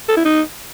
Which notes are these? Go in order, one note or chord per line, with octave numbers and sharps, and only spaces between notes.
A4
E4
D#4